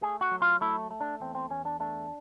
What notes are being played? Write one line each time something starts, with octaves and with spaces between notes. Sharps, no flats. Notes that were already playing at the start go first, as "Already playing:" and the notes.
A3 G#4
F#4
F#3
F4
A3 E4
A3
D4
E2 C4
C4
E2 C#4
D4
A3 D4